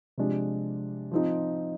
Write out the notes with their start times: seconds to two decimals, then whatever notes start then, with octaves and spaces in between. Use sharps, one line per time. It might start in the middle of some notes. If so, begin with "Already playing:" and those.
0.18 C3 F3 G#3 D4
1.12 F3 C4 D#4